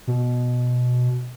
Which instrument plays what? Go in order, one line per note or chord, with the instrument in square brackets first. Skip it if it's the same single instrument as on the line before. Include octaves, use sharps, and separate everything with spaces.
[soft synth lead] B2